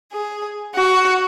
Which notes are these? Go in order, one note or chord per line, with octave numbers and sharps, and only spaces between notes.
G#4
F#4